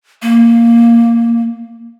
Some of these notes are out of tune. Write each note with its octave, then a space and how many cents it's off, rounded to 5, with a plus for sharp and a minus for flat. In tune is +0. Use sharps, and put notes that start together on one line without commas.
A#3 -5